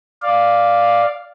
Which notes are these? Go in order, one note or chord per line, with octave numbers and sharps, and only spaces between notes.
D5 F5